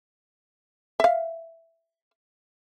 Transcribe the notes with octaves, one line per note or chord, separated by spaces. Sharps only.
E5 F5